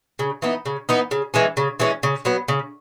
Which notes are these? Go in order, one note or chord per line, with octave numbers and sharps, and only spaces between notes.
C#3
E3 B3 D#4
C#3
E3 B3 D#4
C#3
E3 G#3 C#4
C#3
E3 G#3 C#4
C#3
F#3 B3
C#3